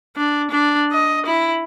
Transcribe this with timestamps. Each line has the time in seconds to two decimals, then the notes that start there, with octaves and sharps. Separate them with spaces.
0.17 D4
0.51 D4
0.92 D#5
1.26 E4